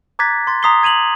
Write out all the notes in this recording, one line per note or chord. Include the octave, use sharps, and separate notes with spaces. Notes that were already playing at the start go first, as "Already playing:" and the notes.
A#5 D6 F#6 G#6 A6 B6
C6 A6
A#5 C6 D#6 B6 C7 G7
G#6 D#7 F7 F#7